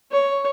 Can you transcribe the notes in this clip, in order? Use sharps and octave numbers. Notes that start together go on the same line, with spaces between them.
C#5